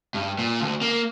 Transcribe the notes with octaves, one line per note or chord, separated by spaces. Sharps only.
G2
A#2
D2
A#3